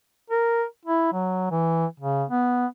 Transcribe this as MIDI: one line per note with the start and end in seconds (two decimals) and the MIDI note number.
0.30 0.65 70
0.85 1.12 64
1.12 1.47 54
1.51 1.86 52
2.00 2.24 49
2.30 2.66 59